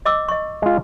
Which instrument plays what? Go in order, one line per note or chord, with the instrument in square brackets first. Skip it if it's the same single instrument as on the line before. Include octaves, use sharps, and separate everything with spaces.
[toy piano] D#5 D6 E6
D#5 C#6
[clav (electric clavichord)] G#3 F4